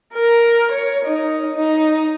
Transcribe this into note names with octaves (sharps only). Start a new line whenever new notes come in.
A#4
C#5
D#4
D#4